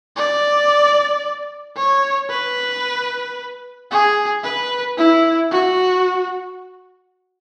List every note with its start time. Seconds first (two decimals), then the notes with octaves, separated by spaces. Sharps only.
0.16 D5
1.76 C#5
2.30 B4
3.91 G#4
4.44 B4
4.97 E4
5.51 F#4